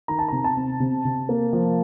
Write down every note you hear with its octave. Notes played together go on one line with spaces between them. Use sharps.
D#3 A#5
A5
C3 A#5
A5
C4
C3
C3
A#3
F3